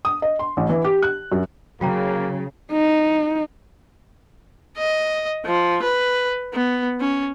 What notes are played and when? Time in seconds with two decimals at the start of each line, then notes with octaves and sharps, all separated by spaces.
0.05 D#6
0.22 D#5
0.39 C6
0.57 A1
0.69 E3
0.85 G4
1.03 F#6
1.32 F#2
1.81 C#3 F#3 A#3 F#4 G5 A#5
2.72 D#4
4.77 D#5
5.46 F3
5.83 B4
6.54 B3
7.00 C#4